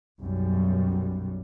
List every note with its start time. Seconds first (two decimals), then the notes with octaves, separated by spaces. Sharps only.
0.22 B1 F#2 G3